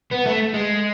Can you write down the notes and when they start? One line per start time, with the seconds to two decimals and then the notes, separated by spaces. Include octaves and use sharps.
0.11 B3
0.26 A3
0.54 G#3